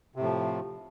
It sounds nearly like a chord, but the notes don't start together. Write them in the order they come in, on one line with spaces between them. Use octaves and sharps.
C3 A2 F3